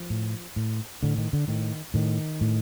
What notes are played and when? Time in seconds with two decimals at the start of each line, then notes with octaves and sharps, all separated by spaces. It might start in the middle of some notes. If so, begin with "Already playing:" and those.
Already playing: F3
0.10 A2
0.56 A2
1.03 A2 D3
1.18 D#3
1.33 D3
1.48 A2 D#3
1.94 A2 D#3
2.41 A2